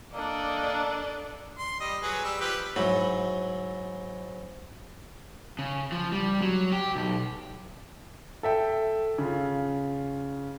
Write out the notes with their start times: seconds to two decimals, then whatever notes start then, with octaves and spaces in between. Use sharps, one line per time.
0.14 A#3 D4 A4 D5 D#5
1.58 C6
1.80 G3 D#5
2.03 F#3 G#4 B4
2.24 G3 E6
2.41 F3 G4 B4
2.76 G#2 F#3 E4
5.59 C#3
5.92 F3
6.12 G3
6.42 F#3
6.72 G4
6.95 B1
8.43 A4 E5 G5
9.18 C#3 F4